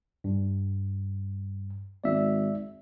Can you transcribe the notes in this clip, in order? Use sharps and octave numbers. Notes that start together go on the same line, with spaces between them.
G2
G#1 D5 E5